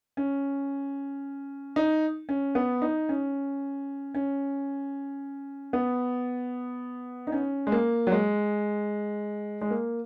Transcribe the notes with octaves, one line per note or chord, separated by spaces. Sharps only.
C#4
D#4
C#4
B3
D#4
C#4
C#4
B3
D#4
C#4
G#3
A#3
F#3
G#3
G#3
A#3